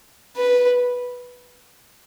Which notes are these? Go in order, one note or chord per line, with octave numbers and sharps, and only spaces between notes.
B4